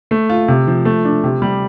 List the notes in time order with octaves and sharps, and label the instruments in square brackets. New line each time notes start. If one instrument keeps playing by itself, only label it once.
[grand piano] A3
F4
C3
F3
A3
D4
C3
G3